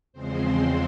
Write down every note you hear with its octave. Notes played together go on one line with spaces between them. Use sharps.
E2 C#3 F3 G#3 C4 C5